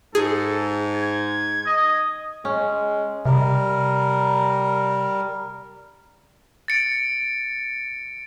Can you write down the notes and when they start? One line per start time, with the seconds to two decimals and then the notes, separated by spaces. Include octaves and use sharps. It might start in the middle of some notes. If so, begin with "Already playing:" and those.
0.15 G#2 G#4 A4
0.96 G#6
1.66 D#5
2.45 G#3 C#4
3.26 C3 G3 A#4
6.68 A6 C#7 D7